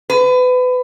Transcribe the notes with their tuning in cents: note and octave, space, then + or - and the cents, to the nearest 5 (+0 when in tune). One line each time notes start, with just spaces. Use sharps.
B4 +30